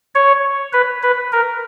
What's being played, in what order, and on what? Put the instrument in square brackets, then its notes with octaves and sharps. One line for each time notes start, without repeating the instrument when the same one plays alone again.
[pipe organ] C#5
B4
B4
A#4